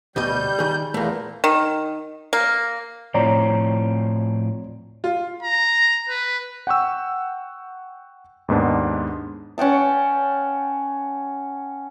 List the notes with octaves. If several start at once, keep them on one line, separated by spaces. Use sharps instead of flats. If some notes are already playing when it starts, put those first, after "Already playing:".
D2 B2 G3 D#5 G6
D#3 G#4
E2 A#2 E3 A3 A#3
D#3
A#3
A2 F3 C4 C#5 D5 A#5
F4
A#5
B4
F#5 G5 C#6 E6
D#2 G#2 B3 D4
C#4 F#5 G5 A5